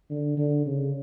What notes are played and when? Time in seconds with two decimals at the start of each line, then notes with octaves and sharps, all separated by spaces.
0.10 D3
0.38 D3
0.66 C#3